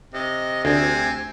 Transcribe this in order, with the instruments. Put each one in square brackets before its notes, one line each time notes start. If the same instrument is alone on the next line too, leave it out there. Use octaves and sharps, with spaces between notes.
[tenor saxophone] C3 [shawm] D#5
[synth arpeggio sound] D2 [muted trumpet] C4 [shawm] G#5